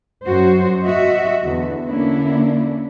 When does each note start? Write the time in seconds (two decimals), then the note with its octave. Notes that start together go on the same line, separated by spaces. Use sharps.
0.24 F#2 F#4 C5
0.84 F#4 D#5 E5
1.41 E2 D3
1.85 D3 A#3 C#4 D4 E4